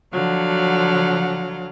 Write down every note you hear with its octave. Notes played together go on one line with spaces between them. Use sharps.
D3 F3 F#3 F5 F#5